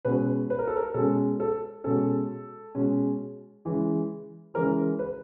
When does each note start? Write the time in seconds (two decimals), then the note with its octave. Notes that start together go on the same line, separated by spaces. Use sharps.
0.05 B2 G#3 C#4 B4
0.50 B4
0.59 A#4
0.68 A4
0.77 A#4
0.94 B2 G#3 C#4 A4
1.40 A4
1.84 B2 G#3 C#4 A4
2.75 B2 G#3 C#4
3.65 C#3 E3 G#3
4.54 C#3 E3 G#3 A#4
4.99 B4